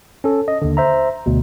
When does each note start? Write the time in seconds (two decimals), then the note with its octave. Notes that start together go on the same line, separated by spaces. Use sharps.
0.24 C#4 A4
0.48 D#5
0.62 D#2 D3
0.77 C5 E5 A#5
1.26 D2 B2